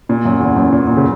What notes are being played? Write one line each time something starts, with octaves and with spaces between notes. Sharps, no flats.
A#2
F#2
E2
F#2
A#2
A#2
C#3